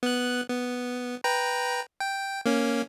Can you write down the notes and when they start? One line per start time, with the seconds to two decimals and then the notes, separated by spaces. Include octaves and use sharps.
0.03 B3 F#6
0.49 B3
1.24 B4 G5 A#5
2.00 G5
2.46 A#3 C#4